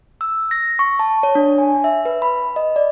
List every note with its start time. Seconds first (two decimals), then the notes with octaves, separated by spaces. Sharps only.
0.21 E6
0.51 A#6
0.79 C#6
0.99 A5
1.23 C#5
1.35 D4
1.58 G#5
1.84 E5
2.05 B4
2.22 B5
2.56 D#5
2.76 D5